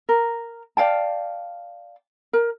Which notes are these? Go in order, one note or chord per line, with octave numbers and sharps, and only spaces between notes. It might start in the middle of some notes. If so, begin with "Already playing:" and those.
A#4
D5 F5 G5 A5
A#4